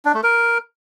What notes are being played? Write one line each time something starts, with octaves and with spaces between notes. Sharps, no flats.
D4
A3
A#4